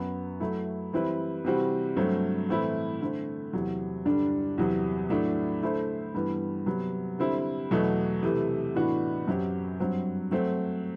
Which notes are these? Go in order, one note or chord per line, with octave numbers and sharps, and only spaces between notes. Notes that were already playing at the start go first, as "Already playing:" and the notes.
Already playing: F#2 F#3 B3
F#3 A3 E4
E3 G3 C4 E4 B4
C3 E3 G3 C4 F#4
G2 F#3 A3 C4
A2 E3 A3 C4 E4
D3 A3 C4
E2 C3 F#3
G2 D3 G3 D4
E2 C3 F#3
A2 F#3 A3 D4
D3 A3 E4 A4 C5
G2 E3 B3
C3 F#3 B3
D3 G3 C4 E4
E2 B2 F#3 A3
C3 E3 A3
A2 E3 B3 D4 F#4
F#2 F#3 C4 G4
G2 F#3 C4
F#3 A3 C4